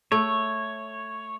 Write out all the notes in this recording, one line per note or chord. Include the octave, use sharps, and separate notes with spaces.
A3 C#5